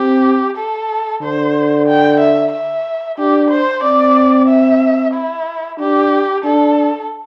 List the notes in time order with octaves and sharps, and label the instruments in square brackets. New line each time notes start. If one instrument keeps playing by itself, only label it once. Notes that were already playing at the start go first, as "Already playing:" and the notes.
Already playing: [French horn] C4 [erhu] G4
[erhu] A4
[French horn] D3 [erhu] C5
[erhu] G5
E5
E5
[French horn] D4 [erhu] G4
[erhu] C5
[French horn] C4 [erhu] D5
[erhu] E5
E4
[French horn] D4 [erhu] G4
[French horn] D4 [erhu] A4